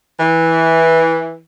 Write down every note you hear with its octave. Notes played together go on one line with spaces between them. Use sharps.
E3